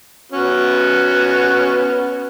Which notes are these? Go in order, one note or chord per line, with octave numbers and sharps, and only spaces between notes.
B3 C#4 F#4